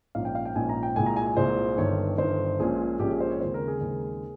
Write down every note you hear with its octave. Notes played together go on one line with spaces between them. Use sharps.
A#1 G#2 F3 A#3 C#4 F5
G5
F5
G5
A#1 G#2 F3 A#3 C#4 G#5
A#5
G5
C2 A#2 G#3 G#5
A#5
G#5
G#5
C2 A#2 G#3 C5
G1 G2 D#3 C#5
G1 G2 D#3 C5
A#1 A#2 G#3 C#4 G#4
A#1 A#2 G#3 C#4 G4
G#4
C5
C#5
D#2 C#3 G#3 C4 C5
A#4
G#4
D#2 C#3 G#3 C4